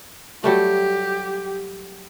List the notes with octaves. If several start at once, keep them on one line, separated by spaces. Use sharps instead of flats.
F#3 G3 A3 G4